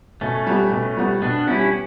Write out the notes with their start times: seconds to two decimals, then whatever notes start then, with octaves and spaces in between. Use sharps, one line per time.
0.21 B2 A3 C#4
0.47 G3 B3
0.71 B2
0.97 G3 B3
1.21 B2 B3 D4
1.47 G3 B3 C#4 E4